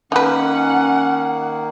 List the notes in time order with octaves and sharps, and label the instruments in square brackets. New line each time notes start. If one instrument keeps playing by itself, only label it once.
[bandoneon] D#3 A#3 [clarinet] C#4 [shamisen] D#4 B4 [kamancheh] F#5